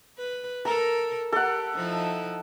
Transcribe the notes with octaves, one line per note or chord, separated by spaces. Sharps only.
B4
A4 A#4 A#5
G4 A4 A#4 F#5
F3 D#4 E4